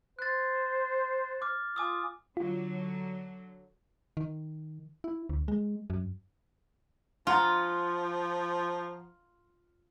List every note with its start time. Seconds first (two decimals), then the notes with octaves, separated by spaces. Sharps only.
0.19 C5 F#6 A6
1.42 D6 F6
1.76 F4 G#5 D6 D#6
2.37 D3 F#3 F4
4.17 D#3
5.04 E4
5.29 D2
5.48 G#3
5.90 F#2
7.27 F3 F4 F5 F#5 A#5